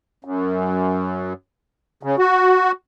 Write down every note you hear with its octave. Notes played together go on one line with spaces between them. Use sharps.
F#2
C#3
F#4